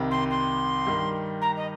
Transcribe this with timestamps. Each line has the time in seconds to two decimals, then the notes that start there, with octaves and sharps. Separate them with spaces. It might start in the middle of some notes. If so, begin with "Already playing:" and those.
Already playing: C2 C3 D#3 G3
0.11 C6
0.30 C6
0.86 G2 D#3 G3
1.41 A#5
1.57 D#5